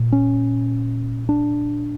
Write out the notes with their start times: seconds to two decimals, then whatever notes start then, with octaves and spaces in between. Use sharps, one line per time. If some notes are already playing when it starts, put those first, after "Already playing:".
Already playing: A#2
0.12 C#4
1.29 D4